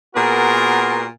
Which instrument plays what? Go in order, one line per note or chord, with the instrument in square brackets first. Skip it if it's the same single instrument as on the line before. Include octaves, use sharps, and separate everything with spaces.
[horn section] A#2 B3 F#4 G#4 A#4 C6